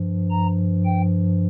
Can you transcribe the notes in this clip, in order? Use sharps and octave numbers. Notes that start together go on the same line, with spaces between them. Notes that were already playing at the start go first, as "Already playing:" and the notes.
Already playing: G2 F3
A#5
G5